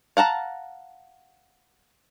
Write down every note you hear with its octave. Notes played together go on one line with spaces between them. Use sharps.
F5 F#5 A5 A#5